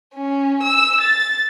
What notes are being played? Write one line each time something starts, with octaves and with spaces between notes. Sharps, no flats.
C#4
E6
A6